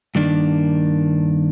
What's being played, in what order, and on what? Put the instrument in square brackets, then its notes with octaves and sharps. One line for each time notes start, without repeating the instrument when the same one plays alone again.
[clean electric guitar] G2 D#3 A#3 D4